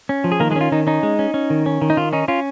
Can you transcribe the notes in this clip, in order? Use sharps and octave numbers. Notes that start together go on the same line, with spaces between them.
C#4
F3
G#4
D#3 A#3 A#4
G#3 G#4
C#4
F4
D#3 D#4
C#4 D#4
G#3
C#4
C#4
D#3
C#4
D#3
D#4
D#3 F4
C#4 D#4
C#4 F4